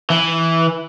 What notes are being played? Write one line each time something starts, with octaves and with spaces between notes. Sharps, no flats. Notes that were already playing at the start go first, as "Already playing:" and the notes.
E3